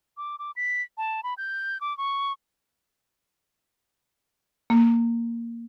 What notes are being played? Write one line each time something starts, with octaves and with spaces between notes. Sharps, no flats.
D6
D6
B6
A5
B5
G6
D6
C#6
A#3